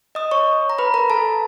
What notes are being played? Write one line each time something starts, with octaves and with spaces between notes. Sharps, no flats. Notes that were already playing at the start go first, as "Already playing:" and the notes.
D#5 D#6
C#5 C#6
A#5
B4 B5
A#4 A#5
A4 A5